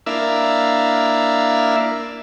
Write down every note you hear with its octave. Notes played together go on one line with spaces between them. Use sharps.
A#3 D4 E4 E5 F5